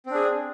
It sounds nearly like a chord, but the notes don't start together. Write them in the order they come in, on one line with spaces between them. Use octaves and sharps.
C4 D4 G#4